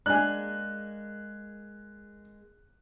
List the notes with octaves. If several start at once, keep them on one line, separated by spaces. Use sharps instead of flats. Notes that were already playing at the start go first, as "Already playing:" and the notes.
G#3 A#3 D4 G#5 F#6